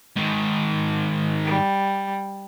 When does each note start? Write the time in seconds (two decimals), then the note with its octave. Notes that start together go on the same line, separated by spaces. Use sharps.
0.17 G#2 D#3
1.45 G3